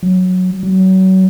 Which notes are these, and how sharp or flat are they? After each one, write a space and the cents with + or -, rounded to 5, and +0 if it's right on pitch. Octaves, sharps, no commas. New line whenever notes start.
F#3 -10
F#3 +30